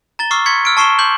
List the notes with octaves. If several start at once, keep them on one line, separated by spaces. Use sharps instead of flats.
A#5 A6 G7
C#6 D6 E6 F6 C7
C6 C#6 G#6 B6 C#7
E6 F6 D7
A5 C#6 C7 E7 G7
C6 D6 G6 F#7